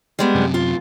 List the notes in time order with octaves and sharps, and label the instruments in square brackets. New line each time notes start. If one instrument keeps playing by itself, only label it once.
[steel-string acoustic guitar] G3 G#3 B3
[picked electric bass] F#2 C3
[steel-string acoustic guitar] F4